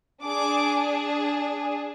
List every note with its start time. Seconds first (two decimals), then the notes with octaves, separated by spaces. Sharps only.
0.22 D4 G#4 D6